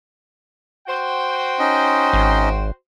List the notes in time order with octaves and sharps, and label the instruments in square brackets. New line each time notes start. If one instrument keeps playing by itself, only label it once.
[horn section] F#4 C5 G5
[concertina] C#4 D#4 D#5
[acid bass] G#1